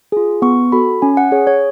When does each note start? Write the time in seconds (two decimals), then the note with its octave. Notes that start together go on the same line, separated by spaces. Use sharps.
0.12 F4 G#4
0.42 B3 C#6
0.72 F#4 A4 B5
1.02 C#4 G#5
1.17 F#5
1.32 G#4 C#5
1.47 C#5